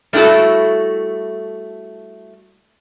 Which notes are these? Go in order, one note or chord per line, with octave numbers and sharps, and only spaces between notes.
G3 A3 E4 F#4 A4